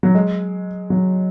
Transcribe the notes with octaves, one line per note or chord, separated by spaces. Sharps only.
F#3
G#3
F#3